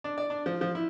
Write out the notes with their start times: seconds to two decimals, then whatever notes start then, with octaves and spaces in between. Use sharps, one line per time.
0.04 D4
0.18 D5
0.30 D4
0.46 F3
0.61 F3
0.75 E4